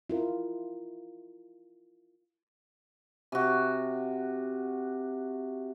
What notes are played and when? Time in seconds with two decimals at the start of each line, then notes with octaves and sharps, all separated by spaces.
0.10 E4 F4 A#4
3.32 C3 F#4